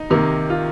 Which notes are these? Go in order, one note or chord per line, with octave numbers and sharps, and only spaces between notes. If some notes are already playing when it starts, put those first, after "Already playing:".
Already playing: D#4
C3 D#3 A#3
F4